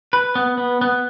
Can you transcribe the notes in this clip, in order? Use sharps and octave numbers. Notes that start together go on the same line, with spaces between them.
B4
B3
B3
B3